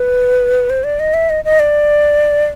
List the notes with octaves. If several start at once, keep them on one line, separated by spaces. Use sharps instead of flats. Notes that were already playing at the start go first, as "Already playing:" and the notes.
Already playing: B4
C5
D5
D#5
E5
D#5
D#5
D5